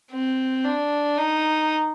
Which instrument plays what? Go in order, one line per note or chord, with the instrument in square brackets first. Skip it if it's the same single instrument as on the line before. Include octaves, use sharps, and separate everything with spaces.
[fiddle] C4
D4
D#4